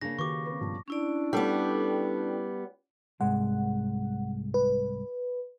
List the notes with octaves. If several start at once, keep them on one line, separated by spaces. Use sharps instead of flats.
C#3 A#3 D4 A#6
D#3 F#4 G4 B4 C#6 D6
C4 B4
G2 B2 F3
C#4 D4 E4 D5
G3 B3 A4 G5
C2 G#2 G#3 F#5
B4